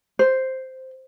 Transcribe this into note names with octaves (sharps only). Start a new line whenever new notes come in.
C5